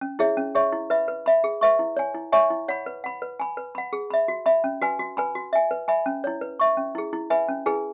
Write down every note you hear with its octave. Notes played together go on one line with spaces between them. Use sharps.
C#4
E4 G#4 C#5 E5
C#4
G#4 C#5 E5 C#6
E4
B4 E5 B5
B4
E5 B5
G#4
B4 E5 C#6
E4
C#5 G#5
E4
C#5 E5 G#5 C#6
E4
C#5 F#5 B5
B4
F#5 B5
B4
G#5 B5
B4
F#5 B5
G#4
E5 B5
F#4
E5 B5
C#4
F#4 B4 G#5
F#4
B4 G#5 B5
F#4
E5 G#5
B4
E5 G#5 B5
C#4
E4 C#5
B4
E5 C#6
C#4
E4 G#4
E4
B4 E5 G#5 B5
C#4
E4 G#4 B4 G#5